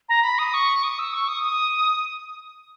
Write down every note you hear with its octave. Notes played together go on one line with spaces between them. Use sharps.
A#5
B5
D#6
C#6
D#6
E6
C#6
D#6
D#6